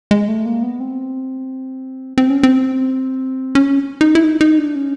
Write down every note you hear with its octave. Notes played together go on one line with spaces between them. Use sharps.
G#3
A3
A#3
B3
C4
C4
C#4
C4
C#4
D#4
E4
D#4
D#4
D4
C#4